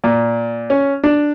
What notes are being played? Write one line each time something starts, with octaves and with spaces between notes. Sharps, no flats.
A#2
C#4
D4